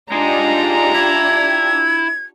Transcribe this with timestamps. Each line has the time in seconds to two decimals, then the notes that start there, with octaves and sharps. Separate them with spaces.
0.12 G#3 D4 D#4 F4 G4 A#5
0.94 E4 G#6